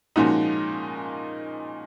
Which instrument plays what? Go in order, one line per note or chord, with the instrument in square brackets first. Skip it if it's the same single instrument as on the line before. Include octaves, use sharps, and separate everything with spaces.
[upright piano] A#2 F3 G#3 C#4 F#4 [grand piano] D#4